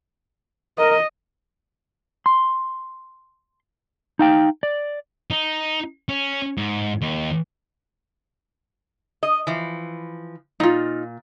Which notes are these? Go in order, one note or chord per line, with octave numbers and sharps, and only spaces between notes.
A#4 D#5
C6
D#4 F5 G5
D5
D#4
C#4
G#2
D#2
D#5
E3 F3
A#2 D#4 F4